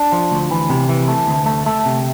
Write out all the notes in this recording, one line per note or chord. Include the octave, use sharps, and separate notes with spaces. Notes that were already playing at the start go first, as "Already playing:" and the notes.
Already playing: D4
F3
D2
E3
C3
E3
A3
D2
A3
A3
C3